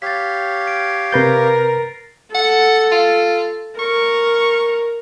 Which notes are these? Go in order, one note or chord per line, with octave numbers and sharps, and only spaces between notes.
G4 C#5 F5 A6 B6
D7
C3 A#4 B4 G6 A6 A#6 C7
A4 F#5
F4
A#4 C#6